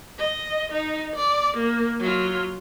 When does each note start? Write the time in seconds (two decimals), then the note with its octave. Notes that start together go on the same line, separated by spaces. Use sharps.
0.18 D#5
0.72 D#4
1.15 D5
1.56 A#3
1.99 F#3 F4